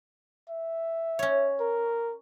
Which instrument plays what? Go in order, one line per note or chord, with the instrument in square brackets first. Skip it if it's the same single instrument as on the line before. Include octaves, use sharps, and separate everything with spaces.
[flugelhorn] E5
[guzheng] C#4 C#5
[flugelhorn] A#4